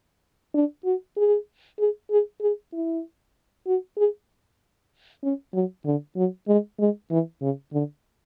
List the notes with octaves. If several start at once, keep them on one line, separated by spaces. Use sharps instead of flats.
D4
F#4
G#4
G#4
G#4
G#4
E4
F#4
G#4
C#4
F#3
D3
F#3
G#3
G#3
E3
C#3
D3